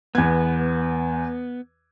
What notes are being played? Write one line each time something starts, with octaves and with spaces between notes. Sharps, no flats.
E2 B3 G#6